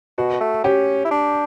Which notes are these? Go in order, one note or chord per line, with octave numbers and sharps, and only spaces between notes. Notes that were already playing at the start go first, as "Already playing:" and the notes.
B2 F#4
A3
C#4 G4
E4
D4